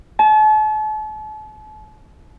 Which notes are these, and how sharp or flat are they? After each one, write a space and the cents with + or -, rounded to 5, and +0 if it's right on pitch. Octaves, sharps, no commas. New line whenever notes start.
A5 -40